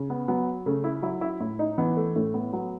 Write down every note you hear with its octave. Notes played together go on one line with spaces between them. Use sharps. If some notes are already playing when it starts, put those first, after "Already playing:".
Already playing: C#3
B3
F#3 B3
C#3 A3
E4
F#3 E4
E4
A2 E4
D#4
E3 B3
A3
A2 A3
B3
F#3 B3